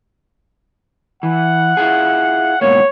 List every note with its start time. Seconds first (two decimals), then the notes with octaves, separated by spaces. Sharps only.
1.23 E3 F#5
1.77 E4 F4 G#4
2.61 G#2 B2 A#3 C#5